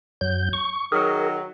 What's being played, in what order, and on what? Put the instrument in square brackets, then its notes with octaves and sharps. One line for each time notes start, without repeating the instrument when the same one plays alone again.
[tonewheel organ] F#2 F#3 G6
C#6
[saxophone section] D#3 F#3 [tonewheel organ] G#4 A#4